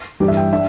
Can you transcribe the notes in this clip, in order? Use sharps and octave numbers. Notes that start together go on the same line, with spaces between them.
G2 E3 G3 D4 G4
E5
G5
D4 E5